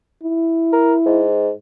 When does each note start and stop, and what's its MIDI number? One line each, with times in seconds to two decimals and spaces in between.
0.23 1.26 64
0.73 0.94 70
1.06 1.50 44